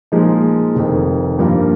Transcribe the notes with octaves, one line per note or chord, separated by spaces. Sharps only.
A#2 F3 G#3 D#4
F1 F2 D#3
G2 F3 A#3 F4 A#4